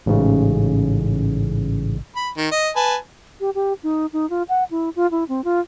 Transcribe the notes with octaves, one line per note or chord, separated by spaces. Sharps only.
A1 G#2 C#3
B5
D#3
D#5
B4 G#5 A5
G4
G4
D#4
D#4
F4
F#5
E4
F4
E4
C4
F4